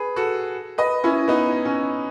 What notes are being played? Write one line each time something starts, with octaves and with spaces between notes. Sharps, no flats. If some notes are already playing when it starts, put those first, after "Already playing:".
Already playing: G#4 B4
F#4 A4
B4 D#5
C#4 E4
B3 D#4
C#4